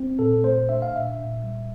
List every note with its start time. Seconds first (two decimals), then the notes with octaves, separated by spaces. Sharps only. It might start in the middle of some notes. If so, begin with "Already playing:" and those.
Already playing: C4
0.19 A#2 A4
0.43 A3 C5
0.69 D4 E5
0.82 F5
0.94 A#2 E5
1.19 A#2
1.44 G3